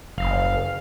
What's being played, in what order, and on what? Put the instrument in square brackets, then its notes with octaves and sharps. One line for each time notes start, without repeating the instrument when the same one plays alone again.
[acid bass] F#1 [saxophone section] F5